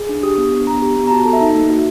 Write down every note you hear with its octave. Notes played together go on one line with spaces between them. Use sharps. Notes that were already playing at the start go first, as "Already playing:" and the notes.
Already playing: G#4
D4
G4 D#6
B3
D4
B3 A#5
G4
B3
A#5
F#4 A5
A4
E5
D#4
A#3
F#4